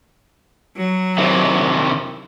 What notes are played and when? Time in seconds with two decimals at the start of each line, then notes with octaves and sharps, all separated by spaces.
0.77 F#3
1.18 C3 D#3 E3